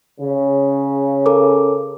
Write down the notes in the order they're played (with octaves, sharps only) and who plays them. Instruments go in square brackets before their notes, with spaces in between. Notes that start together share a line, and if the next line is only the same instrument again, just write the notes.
[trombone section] C#3
[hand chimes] A4 A#4 D6